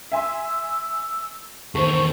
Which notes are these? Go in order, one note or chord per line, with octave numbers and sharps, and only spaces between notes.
E5 G#5 C6 E6
E2 D#3 A4 C5 C#6